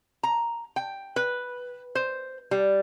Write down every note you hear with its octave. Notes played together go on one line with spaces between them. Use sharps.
A#5
G5
B4
C5
G3